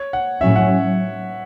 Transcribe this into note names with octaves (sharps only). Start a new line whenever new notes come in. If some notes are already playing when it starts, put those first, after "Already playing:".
Already playing: C#5
F#5
A2 F#3 C#4 E5
F#5